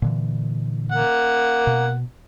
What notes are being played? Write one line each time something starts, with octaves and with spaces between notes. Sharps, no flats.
A#2 D3 E3
A#3 F#5
B2